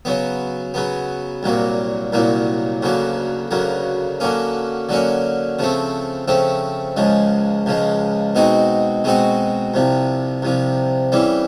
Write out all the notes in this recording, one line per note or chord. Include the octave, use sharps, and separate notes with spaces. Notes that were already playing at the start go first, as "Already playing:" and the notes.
C#3 F#3 B3
C#3 F#3 B3
C2 A#2 F#3 A#3
C2 A#2 F#3 A#3
D2 C#3 F#3 A#3
D2 C#3 F#3 A#3
D3 F#3 A#3 C#4
D3 F#3 A#3 C#4
C#3 F3 A3 C4
C#3 F3 A3 C4
C#2 C#3 F3 G#3
C#2 C#3 F3 G#3
B2 G#3 C4 D#4 F#4
B2 G#3 C4 D#4 F#4
C2 C3 F3
C2 C3 F3
C#3 E3 G3 C4